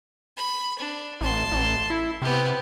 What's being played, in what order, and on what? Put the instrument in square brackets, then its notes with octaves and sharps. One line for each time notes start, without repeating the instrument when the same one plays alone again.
[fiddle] B5
D4
[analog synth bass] A1 [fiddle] A5 C6
[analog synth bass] A1
E4
[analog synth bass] C3 [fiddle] B3 G4